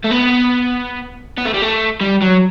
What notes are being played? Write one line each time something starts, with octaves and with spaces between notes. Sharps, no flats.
A3
B3
B3
A3
G3
A3
G3
F#3